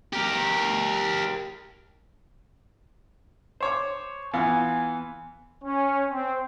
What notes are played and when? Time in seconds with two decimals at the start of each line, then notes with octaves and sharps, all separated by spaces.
0.13 G4 A#4
3.61 C5 C#5 D6
4.33 E3 B3 F4 G#5
5.64 C#4
6.09 C4